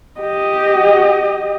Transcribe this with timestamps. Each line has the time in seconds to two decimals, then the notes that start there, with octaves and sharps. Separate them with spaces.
0.20 G4 D#5